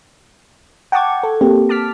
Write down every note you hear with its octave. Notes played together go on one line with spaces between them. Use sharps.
F#5 G5 A5 C#6 D6 G#6
A4
A#3 C4 G4
A5 D6 F6 B6